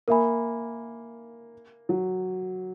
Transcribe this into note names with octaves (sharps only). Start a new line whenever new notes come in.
A#3 A#4 E5 G#5 B5
F#3